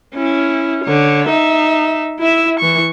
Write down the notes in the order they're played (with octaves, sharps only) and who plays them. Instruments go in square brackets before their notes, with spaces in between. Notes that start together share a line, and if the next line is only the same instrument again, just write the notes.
[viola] C#4 E4
D3 C#5
D#4 E5
E4 E5
E3 C#6